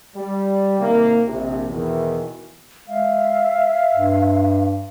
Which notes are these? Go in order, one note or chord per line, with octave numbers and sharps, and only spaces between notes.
G3
C3 D#3 A#3
A#1 C3
E2 B2 D#3 E3
G#3 E5 F5
G2